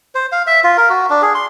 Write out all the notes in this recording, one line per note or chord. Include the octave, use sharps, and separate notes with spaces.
C5
F5
E5
F4
A#4
F#4
D4
G#4
C6